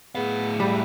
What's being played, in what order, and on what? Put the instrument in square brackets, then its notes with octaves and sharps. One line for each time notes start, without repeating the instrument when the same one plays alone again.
[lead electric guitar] A2 F5 [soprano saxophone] B3 [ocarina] G#4
[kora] G3 [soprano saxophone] B5